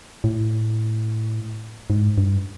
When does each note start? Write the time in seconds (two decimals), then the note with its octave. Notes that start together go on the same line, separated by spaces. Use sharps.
0.24 A2
1.90 G#2
2.18 G2